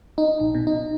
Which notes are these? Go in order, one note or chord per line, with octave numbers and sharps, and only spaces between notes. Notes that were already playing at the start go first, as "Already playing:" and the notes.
D#4
A#1
B2
D#4